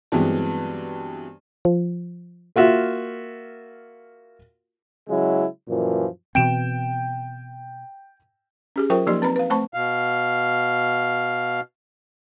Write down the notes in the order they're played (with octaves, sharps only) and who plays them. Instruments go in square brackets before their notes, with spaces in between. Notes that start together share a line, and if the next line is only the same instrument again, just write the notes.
[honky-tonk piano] G2 E3 F#3 G#3 B3 C4
[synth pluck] F3
[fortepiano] A#3 F4 F#4 E5
[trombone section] C#3 F#3 G#3 E4
F#2 A#2 E3 F3
[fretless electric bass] B2 E3 C4 [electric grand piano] G5 D7 E7
[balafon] C#4 G4 G#4
F#3 F4 A#4 C5 G5 C#6
F3 A#3 D#4 G4 D5 C6
C4 B4 A#5 B5
B4 F5
A3 C4 C5 A5 B5 C#6
[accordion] B2 F5